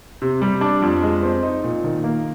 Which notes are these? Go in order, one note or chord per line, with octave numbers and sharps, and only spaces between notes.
C3
G3
D4
F2
G#3
C4
D#4
A#2
D#3
A#3